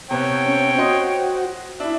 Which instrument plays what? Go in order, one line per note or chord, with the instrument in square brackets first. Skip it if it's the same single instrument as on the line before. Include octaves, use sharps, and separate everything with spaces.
[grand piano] C3 B3 [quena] C5 [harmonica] C#5 G5
[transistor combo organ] C#4
[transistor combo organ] F#4 [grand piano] D#5 C6 D#6
[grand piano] D4 E4 [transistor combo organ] E5